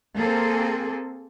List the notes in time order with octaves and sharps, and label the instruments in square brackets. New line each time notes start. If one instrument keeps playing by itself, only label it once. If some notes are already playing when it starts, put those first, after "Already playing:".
[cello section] A#3 C4 G#4 A4